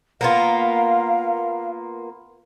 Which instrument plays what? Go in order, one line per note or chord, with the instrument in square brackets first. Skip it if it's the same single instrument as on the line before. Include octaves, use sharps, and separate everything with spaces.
[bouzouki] A#3 B3 F4 [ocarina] F5